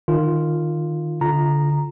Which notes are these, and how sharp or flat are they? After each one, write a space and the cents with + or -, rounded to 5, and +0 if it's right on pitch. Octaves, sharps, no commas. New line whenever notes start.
D#3 -20 F4 +0
D3 -20 F4 +0 A#5 +0